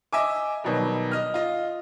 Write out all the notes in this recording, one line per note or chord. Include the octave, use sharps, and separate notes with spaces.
D#5 E5 G#5 D6
B2 D#3 F#3 G3
D#5 F6
F4 D#5